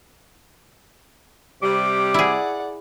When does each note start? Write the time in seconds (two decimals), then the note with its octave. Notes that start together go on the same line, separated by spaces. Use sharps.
1.62 C3 G3 D6
2.14 E4 G#4 D5 F#5